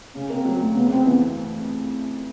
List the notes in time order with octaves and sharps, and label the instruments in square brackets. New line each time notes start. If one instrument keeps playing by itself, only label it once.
[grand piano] C#3 [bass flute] C#4
[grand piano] A#3 [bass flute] C4
[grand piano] F#3
D2
[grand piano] C#3 [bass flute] B3
[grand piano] F2 [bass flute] C4
[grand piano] E3 [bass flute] B3